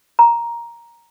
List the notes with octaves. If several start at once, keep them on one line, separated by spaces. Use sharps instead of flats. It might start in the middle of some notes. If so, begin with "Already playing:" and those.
A#5